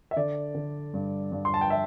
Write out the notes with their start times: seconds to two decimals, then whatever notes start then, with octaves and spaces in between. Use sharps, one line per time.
0.11 E5
0.16 D3 D5
0.55 D3
0.94 G2
1.32 G2
1.45 C6
1.54 A5
1.61 G5
1.70 E5